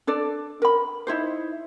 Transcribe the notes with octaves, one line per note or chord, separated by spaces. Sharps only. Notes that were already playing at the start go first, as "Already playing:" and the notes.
D4 A4 D5
A#4 B5
D#4 E4 G4 C5